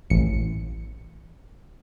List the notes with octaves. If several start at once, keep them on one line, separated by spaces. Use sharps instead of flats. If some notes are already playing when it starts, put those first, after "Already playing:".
A1 C#7